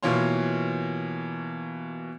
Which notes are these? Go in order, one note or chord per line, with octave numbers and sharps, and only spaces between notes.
B2 E3 A#3 F4 C#5 C6